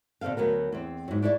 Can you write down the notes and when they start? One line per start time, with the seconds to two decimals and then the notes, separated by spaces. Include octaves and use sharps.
0.21 B2 D3 C4 A4 F5
0.37 D2 F#3 B3 A#4
0.72 E2 C4
1.08 G#2 F#3
1.22 D4 E4 C#5 D5